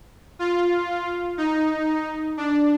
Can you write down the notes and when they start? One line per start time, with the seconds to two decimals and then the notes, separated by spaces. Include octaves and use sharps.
0.39 F4
1.38 D#4
2.37 D4